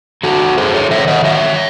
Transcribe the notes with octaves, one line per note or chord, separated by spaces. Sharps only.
F#3 F#4 A4
F#2 G#4 C5
A4 C#5
D#3 C#5 E5
D#5 F#5
F#3 C#5 E5